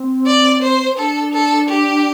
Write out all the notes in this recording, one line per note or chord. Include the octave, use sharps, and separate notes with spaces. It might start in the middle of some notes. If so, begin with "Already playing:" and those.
Already playing: C4
D5
C5
D4 A4
A4
G4